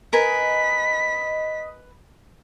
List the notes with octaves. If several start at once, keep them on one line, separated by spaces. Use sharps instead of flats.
A#4 B4 D#5 G#5 B6